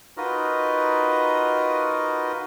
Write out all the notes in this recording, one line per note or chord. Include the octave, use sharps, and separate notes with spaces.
D#4 F4 F#4 A#4 B4 D#5